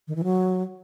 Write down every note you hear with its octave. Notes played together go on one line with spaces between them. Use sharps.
D#3
E3
F#3